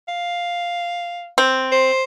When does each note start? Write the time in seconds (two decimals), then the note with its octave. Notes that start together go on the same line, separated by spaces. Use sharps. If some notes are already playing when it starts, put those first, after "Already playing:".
0.08 F5
1.38 C4
1.72 C5